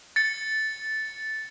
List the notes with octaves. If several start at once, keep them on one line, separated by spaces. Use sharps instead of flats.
A6 C#7